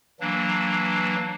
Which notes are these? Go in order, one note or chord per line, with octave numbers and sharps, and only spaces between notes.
E3 F#3 A#3 D4